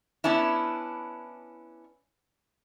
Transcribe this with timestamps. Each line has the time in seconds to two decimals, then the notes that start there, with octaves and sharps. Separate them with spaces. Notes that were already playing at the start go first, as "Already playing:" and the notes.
0.24 B3 C#4 D4 E4